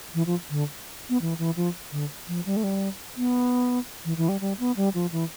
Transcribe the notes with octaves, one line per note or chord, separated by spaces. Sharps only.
E3
F3
D3
B3
E3
E3
F3
D3
F3
G3
A3
G3
B3
E3
E3
G3
G3
B3
G3
F3
E3